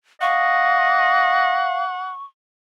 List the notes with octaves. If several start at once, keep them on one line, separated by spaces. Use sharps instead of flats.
D#5 F5 F#5 C#6